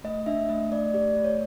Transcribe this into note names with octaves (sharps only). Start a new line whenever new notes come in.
A3 D#5
D4 E5
A3 D#5
A3 D5
G4 D5
A3
C#5